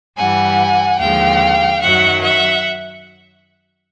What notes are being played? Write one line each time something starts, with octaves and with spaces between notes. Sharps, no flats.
G2 E3 G3 F#5 G#5
D#2 D3 F3 G#3 F5 G5
F#2 D#3 F#3 E5 F#5
E5 F#5